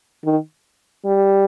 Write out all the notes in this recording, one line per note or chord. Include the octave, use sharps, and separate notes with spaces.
D#3
G3